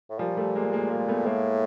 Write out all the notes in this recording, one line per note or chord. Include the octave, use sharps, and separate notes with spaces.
A2
A#2 F3 G3
G3 A3
G#3 A#3
G#3 A#3
G#3 A#3
A3 B3
A2 G#3 A#3